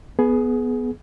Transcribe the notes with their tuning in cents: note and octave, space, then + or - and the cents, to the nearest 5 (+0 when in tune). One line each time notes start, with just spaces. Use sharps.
B3 +0 G#4 +20